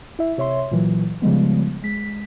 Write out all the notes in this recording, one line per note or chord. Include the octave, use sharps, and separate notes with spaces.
E4 E5
C3 C#5 E5 C6
A#2 E3 F#3
C#3 F3 G3 G#3 B3
G#3 B6